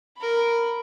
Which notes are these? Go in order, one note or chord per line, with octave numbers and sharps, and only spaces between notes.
A#4 B5